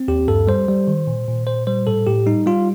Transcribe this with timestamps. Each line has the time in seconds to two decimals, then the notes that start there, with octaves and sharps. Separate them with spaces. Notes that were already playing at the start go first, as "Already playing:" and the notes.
Already playing: C4
0.08 D#2 G4
0.28 G2 A4
0.47 G3 C5
0.68 G3
0.87 D#3
1.07 A#2
1.28 A#2
1.47 A#2 C5
1.67 G3 C5
1.87 A2 A4
2.07 A2 G4
2.26 G3 D#4
2.46 G3 F4